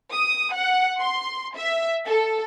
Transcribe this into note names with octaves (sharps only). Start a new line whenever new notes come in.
D#6
F#5
C6
E5
A4